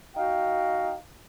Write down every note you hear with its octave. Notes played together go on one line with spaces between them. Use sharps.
D#4 F#4 F5 G5